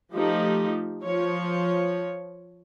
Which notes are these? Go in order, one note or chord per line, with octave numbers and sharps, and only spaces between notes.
F3 A3 D#4 G4
F3 F4 C#5